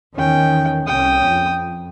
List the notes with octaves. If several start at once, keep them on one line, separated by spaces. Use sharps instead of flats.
E2 D#3 C#4 G5
C2 C#4 G5 D#6
F2